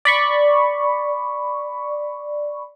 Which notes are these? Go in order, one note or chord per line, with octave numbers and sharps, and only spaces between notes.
D5 B5 C#6